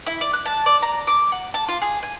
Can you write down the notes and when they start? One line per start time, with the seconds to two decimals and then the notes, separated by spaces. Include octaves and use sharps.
0.07 E4
0.21 D5
0.33 F#6
0.46 A5
0.66 D5
0.82 A#5
1.07 D6
1.32 F#5
1.54 A5
1.69 F4
1.82 G#4
2.03 G#5